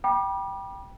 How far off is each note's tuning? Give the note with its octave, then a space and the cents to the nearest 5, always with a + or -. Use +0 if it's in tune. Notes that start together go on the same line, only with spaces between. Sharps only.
G5 +0 B5 -35 D6 +30